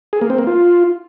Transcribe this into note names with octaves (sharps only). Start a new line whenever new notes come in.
G#4
A#3
C4
A#3
F4